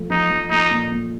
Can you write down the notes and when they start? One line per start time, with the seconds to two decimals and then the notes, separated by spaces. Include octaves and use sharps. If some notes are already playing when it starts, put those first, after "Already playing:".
Already playing: F3 A3
0.10 F3 D#4
0.30 F3
0.50 A3 D#4
0.71 A#2
0.92 A#2